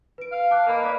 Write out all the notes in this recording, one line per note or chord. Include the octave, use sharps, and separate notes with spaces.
B4 D7
F5
A5 D6 F#6
A#3 A#4 D#5 B5
B4 D5 B5